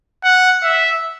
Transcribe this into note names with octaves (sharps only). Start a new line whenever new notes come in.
F#5
E5